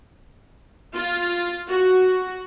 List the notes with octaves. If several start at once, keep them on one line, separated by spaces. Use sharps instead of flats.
F4
F#4